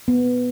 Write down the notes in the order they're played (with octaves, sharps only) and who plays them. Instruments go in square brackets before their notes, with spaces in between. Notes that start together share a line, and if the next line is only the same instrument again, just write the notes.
[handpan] B3